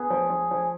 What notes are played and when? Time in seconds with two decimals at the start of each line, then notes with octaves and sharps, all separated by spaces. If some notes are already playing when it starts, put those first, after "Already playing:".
Already playing: B3 G#4
0.10 F3
0.30 F3
0.51 F3